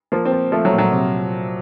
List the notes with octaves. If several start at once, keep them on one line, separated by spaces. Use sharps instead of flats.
F3 A#3
C4
F3
F3 A3
F#3
A#2
F#3
C3